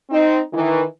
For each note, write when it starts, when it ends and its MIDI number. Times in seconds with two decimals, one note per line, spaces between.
0.11 0.40 60
0.11 0.40 63
0.53 0.81 51
0.53 0.81 52